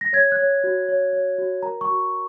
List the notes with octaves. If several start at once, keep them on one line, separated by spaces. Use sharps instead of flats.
A#6
C#5 G#6
F#6
C#5
F#4
C#5
C#5
F#4
A#4 A#5
C#6
F#4